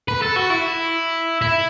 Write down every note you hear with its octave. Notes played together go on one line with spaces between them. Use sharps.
B4
A4
F#4
E4
E4